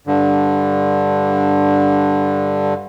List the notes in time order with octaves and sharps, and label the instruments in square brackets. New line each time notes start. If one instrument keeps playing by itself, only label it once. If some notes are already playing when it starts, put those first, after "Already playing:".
[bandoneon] G2 D3